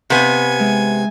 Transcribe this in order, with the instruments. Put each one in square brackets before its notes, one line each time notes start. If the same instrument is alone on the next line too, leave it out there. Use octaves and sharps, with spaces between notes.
[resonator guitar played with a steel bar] C3 B3 [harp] F5 B5 [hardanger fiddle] G#5
[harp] G#3 E5